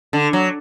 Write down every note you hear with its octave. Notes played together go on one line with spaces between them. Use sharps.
D3
F#3